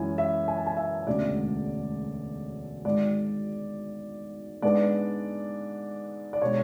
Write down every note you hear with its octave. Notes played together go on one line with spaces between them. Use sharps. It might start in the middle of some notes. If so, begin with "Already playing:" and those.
Already playing: F#2 E3 G#3 C#4 E4 G#5
E5
G#5
A5
G#5
E5
E1 D2 D3 G#3 C#4 D5
G#1 G#2 G#3 D5
G#2 G#3 B3 D4 D5
D5
B2 G#3 D4 C#5